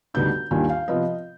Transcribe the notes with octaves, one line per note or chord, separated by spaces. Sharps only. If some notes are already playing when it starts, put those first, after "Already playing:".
D2 D3 G3 B3 D#4 G6
D#2 D#3 G3 D4 F4 G#5
F5
C3 F3 B3 F4 D#5